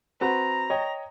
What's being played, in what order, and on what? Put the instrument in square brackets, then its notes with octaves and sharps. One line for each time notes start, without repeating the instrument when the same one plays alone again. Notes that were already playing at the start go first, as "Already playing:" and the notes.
[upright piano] C4 F#4 B4 [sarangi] A#5
[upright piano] C#5 D#5 G5